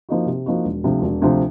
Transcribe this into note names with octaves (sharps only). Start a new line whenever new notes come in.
F3 A#3 D#4 F#4
C3
F3 A#3 D#4 F#4
E1
D2 C3 F3
E1
D2 C3 F3